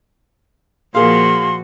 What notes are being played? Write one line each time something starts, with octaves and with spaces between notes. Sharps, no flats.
A#2 F3 A#3 F#4 G#4 F5 C6